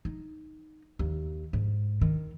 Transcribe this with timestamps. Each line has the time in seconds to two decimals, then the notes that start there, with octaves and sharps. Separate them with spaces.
0.05 D#4
0.99 D#2
1.53 G#2
2.01 D#3